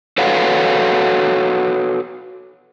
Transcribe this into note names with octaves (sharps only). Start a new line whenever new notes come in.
F#4 A4 B4 C#5 F5 F#5